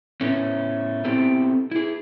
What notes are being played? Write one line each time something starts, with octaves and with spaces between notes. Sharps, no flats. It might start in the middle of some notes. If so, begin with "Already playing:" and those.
A2 A3 B3 C#4
B3 C4 E4 G4 A4
E4 G#4